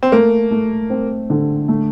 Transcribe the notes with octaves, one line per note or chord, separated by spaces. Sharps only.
C4
A3 A#3
A3
C4
D3
A3